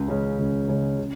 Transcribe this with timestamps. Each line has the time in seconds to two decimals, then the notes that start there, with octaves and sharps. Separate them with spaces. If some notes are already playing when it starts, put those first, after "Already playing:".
Already playing: C#2
0.08 C#3 G#3 C#4
0.39 C#2
0.68 C#3 G#3 C#4
0.98 C#3